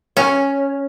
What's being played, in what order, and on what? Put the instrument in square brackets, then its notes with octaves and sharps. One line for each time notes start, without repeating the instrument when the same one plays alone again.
[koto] C#4